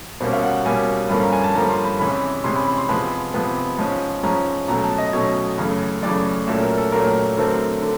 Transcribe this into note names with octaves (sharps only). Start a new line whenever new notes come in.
B2 G3 A#3 C#4 C5
F5
F#5
B2 G3 A#3 C#4 G#5
G2 D3 F3 A#3 C#4 B5
A#5
G#5
A5
G2 D3 F3 A#3 C#4 A#5
C6
B5
C3 E3 G#3 C#4 B5
C3 E3 G#3 C#4 C6
B5
B5
C6
C3 F3 G#3 B3 B5
C3 F3 G#3 B3
G#2 F3 G#3 C#4
G#2 F3 G#3 C#4 A#5
B2 F#3 A3 C#4 A#5
A5
D#5
B2 F#3 A3 C#4 C#5
F#2 C#3 E3 A3
F#2 C#3 E3 A3 D5
A#2 F#3 A3 C#4 E5
A#4
A4
A#2 F#3 A3 C#4 A#4
D3 F#3 A3 C4 A#4
D3